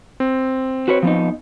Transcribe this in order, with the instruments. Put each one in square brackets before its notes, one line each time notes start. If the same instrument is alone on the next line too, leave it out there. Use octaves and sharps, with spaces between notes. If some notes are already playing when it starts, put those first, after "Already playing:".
[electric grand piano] C4
[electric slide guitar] F#4 B4 C#5
F3 B3 D#4